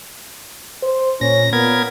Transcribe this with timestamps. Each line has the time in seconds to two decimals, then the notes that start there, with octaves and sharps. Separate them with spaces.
0.82 C5
1.21 A#2 C#4 A#6
1.53 A#2 B3 A#4 G#6